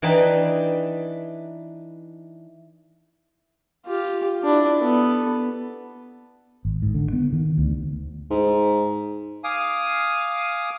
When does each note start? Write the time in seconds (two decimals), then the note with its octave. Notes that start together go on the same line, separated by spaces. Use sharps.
0.02 E3 D4 D#4 B4 G5 A5
3.86 F4 G4
4.43 D4 E4
4.80 B3 A4
6.65 G#1
6.82 G#2
6.95 D3
7.13 B3
7.33 D#3
7.58 D2
8.30 G#2
9.44 F5 G#5 D6 D#6